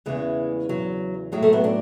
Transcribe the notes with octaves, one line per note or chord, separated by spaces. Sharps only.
E2 C#3 E3 G#3
F#3
A2 F#3 G#3
A3
B3
D4